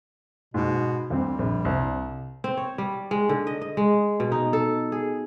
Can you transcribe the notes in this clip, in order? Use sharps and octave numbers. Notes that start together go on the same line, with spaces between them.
G#2 B2
D2 G3 C4
A#1
C2
C4
C#5
G3
G#3
D3
D#5
D#5
G#3
B2
D#4
A4
G#4